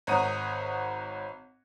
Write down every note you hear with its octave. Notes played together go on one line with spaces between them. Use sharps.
G#1 C#5 F#5 A#5 D#6 D#7